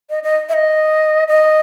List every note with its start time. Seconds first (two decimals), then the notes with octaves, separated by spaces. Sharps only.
0.10 D#5
0.23 D#5
0.49 E5
0.54 D#5
1.28 D#5